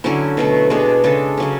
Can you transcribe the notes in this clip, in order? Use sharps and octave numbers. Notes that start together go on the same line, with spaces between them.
D3 F#3 C#4 E4
B2 F#3 A3
B2 G#3 D4 G#4
C#3 G#3 D4 A4
C#3 F#3 C#4